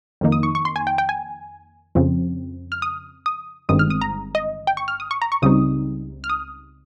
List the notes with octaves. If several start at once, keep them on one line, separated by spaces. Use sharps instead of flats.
F2 D#3 A#3 D#4
D#6
C#6
C#6
C6
G#5
G5
G5
G#5
F2 C#3 F3 C4
F6
D#6
D#6
G1 G2 D#3 G#3 C4 D#6
F6
D#6
A#5
D#5
G5
C#6
F6
D#6
C#6
A#5
C#6
C#2 C#3 G3 C4 D#4 D#6
F6
D#6